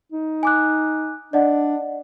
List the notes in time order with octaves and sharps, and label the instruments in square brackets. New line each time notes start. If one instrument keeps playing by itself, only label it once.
[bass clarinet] D#4
[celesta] G#5 D6 F#6
[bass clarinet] D4 [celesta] D5 D#5 F#5